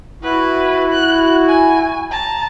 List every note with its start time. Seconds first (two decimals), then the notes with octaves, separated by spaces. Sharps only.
0.23 E4 F#4 B4
0.92 F#6
1.48 G#5
2.11 A5 A#5